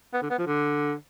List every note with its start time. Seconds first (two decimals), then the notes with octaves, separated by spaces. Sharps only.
0.14 B3
0.22 D3
0.30 B3
0.39 F3
0.47 D3